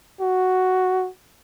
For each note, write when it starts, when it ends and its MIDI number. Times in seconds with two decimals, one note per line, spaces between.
0.20 1.09 66